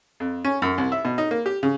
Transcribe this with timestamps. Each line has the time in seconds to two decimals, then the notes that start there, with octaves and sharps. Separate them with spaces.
0.20 F2
0.45 C#4
0.62 F#2
0.78 C2
0.92 E5
1.05 B2
1.18 D#4
1.31 A#3
1.46 G4
1.63 C#3